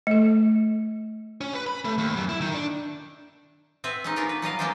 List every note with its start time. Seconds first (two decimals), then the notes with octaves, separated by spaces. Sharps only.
0.07 A3 A4
1.41 C#4
1.54 B4
1.67 B5
1.85 A3
1.98 D#2
2.16 F#2
2.29 E4
2.41 D#3
2.54 D4
3.84 B3 C4 B4 E5
4.04 G#3 C#4 D#4
4.16 B3 D4 F4 F#4 A#4
4.29 B4
4.42 F#3 G3 D#5 F5
4.59 A#3 B3 C#4 D4 F#4 C5